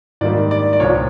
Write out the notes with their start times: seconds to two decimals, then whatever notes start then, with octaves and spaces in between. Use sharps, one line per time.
0.21 G#2 D#3 G3 A#3 D5
0.51 D5
0.73 D5
0.80 C2 A#2 F3 C#5